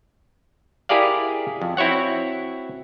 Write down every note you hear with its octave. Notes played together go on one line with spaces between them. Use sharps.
E4 G4 G#4 A#4 D5 F5
F2
C4 E4 F#4 C#5 F#5